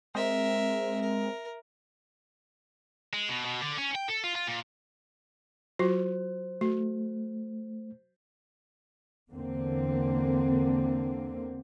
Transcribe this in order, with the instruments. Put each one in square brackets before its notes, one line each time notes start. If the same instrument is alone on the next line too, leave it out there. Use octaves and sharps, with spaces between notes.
[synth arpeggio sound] G#3 C4 [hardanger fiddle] A#4 E5
[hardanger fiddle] A#4
[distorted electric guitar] G#3
B2
B2
D3
C#4
G5
A4
F4
F4
A#2
[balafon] F#3 F4 F#4 [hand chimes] C5
[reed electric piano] A3 [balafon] F#4
[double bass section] E2 D3 A#3 C4